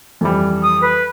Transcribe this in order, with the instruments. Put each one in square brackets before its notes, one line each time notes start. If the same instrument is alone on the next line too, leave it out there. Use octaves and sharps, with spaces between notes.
[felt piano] F2 E3 G3
[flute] D#6
B4